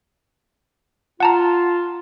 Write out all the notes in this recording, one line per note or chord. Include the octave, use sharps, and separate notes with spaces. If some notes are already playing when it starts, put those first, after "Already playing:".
F4 F#5 A5 A#5